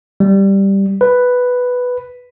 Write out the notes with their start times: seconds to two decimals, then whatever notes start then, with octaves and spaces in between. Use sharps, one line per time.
0.20 G3
1.01 B4